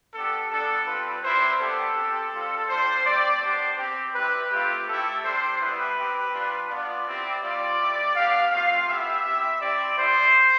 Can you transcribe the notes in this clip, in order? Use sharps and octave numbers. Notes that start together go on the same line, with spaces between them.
B3 D4 G4 A4
G3 B3 D4 A4
G3 C4 F4 B4
G3 C4 E4 C5
B3 D4 G4 A4
C4 G4
G3 C4 F4
G3 D4 F4 C5
A3 C4 G4 D5
B3 D4 G4 C5
C4 G4
G3 C4 E4 G4 B4
A3 C4 F4 G4
A3 E4 G4 A4
G3 D4 G4 C5
G3 B3 E4 G4 B4
C4 G4
G3 D4 F4
B3 D4 F4 D5
C4 E4 G4
G3 C4 F4 D5
A3 E4 G4
B3 D4 G4 F5
A3 C4 F4 F5
B3 E4 G4 E5
C4 E4 G4
C4 E4 G4 D5
G3 B3 E4 G4 C5